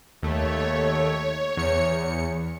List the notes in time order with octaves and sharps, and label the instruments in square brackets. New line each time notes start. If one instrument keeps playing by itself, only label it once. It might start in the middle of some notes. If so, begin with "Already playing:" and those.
[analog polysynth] D#2 A3 [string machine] C#5
[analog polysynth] E2 C#7